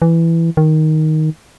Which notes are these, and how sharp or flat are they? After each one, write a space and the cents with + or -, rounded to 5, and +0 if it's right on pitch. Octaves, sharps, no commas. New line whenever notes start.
E3 +10
D#3 +5